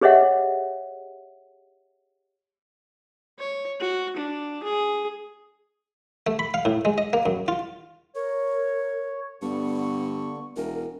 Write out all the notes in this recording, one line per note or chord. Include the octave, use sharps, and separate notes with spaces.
G4 G#4 C#5 D#5 E5 F#5
C#5
F#4
D4
G#4
A3
B5
F5
A2
G#3
D#5
A#3
F#2
F4
A#4 C#5
G2 D3 B3 C#6
E1 A#4